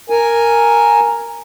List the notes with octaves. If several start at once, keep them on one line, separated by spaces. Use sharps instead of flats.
A#4 G#5